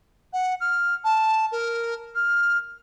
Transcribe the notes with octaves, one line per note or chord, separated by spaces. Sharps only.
F#5
F6
A5
A#4
F6